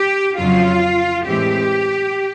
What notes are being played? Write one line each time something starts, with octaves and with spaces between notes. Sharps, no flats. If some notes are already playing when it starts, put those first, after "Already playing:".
Already playing: G4
F2 C#3 F#3 F4
A2 E3 G#3 C4 G4